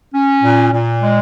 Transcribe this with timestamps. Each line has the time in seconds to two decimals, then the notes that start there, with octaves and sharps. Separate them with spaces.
0.14 C#4
0.43 A#2
0.73 A#2
1.02 G#3